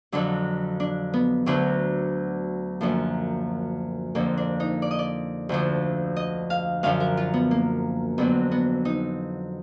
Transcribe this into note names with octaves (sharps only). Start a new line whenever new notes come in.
F2 D3 F#3 D4
D4
B3
D2 D3 F#3 D4
F#2 D3 F3 A#3
F2 D3 F3 A#3
D4
D#4
D5
D#5
D5
D2 D3 F3
D#5
F5
F#2 D3 F3 F5
A#4
F4
B3
A#3
F2 D3 F#3 B3
B3
D#4